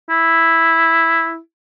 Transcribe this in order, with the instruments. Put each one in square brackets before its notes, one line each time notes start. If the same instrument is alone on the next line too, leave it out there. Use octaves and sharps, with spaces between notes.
[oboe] E4